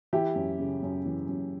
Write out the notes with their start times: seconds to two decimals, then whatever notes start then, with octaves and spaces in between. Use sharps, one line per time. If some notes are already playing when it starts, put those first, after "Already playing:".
0.13 E3 E4 G4
0.36 F#2
0.59 C#3
0.83 F#2
1.06 E3
1.29 F#2